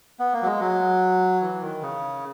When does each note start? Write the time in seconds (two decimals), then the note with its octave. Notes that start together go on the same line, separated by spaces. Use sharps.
0.19 B3
0.33 A#3
0.42 F#3
0.46 G#3
0.60 F#3
1.41 E3
1.62 D#3
1.82 C#3